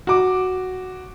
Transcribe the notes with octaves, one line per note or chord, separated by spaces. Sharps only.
F#4 D6